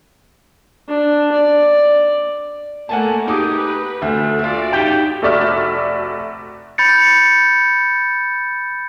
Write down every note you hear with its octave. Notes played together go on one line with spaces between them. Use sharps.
D4
D5
A3 A#3 F#5 G#5 A5
D#4 G4 G#4 D6 D#6
B4
D2 A3 E5
F4 F#4 D5 E5
D#4 G4 G5
F1 A3 F#4 D5 E5 F6
B5 G6 A6 C#7